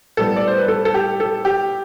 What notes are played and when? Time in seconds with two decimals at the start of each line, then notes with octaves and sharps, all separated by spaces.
0.17 A2 G3 B3 A4
0.36 D5
0.47 C5
0.58 B4
0.68 A4
0.85 A4
0.94 G4
1.20 A4
1.45 G4